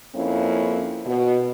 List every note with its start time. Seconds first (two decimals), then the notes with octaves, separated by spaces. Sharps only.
0.15 F2 A#3 C#4 E4
1.06 B2